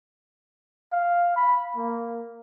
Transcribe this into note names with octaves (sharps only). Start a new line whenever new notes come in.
F5
B5
A#3